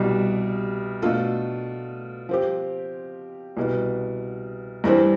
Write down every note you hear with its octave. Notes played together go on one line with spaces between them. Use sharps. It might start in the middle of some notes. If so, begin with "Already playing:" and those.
Already playing: C2 B2 G3
B2 A3 D4 F4 A4
F3 C4 G4
C2 B2 B3
G2 E3 G3 C4